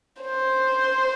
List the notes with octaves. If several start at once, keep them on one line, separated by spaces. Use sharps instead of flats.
C5